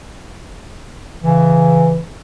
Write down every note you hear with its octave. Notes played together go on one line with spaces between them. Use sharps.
C#3 E3